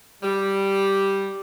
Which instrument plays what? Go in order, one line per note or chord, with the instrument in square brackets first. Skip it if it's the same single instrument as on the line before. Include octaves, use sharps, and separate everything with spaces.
[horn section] G3